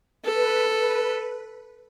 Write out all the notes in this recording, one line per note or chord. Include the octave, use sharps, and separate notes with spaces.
A4 B4
B4